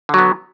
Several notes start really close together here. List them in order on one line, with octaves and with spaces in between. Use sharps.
D3 F#3 B3